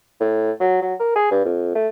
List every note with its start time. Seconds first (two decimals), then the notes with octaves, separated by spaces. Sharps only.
0.20 A2
0.60 F#3
0.82 F#3
1.00 A#4
1.16 G#4
1.31 G2
1.45 F2
1.75 A3